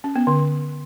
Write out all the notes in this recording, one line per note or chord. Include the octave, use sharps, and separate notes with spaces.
C#4
B3
D3